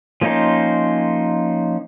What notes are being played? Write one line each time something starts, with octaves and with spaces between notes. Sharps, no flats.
F3 A#3 C#4 D#4 C5